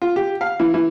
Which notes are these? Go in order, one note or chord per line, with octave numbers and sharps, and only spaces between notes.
F4
G4
F5
E3
E3